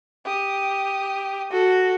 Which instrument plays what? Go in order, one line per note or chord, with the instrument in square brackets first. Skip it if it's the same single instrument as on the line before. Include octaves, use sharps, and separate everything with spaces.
[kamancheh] G4 D#6
[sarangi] F#4 [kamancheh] A4